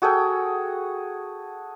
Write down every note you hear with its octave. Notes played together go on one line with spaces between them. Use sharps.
F#4 G#4 A4 G5